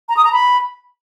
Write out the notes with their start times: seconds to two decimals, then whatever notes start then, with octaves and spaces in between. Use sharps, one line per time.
0.09 A#5
0.17 D#6
0.25 A#5
0.32 B5